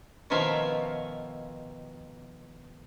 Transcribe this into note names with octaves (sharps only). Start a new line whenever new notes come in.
B2 D#3 F3 C#5 E5 F5